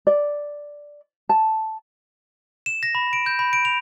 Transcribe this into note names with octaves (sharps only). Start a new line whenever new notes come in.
D5
A5
E7
A#6
B5
D7
G6
B5
D7
F7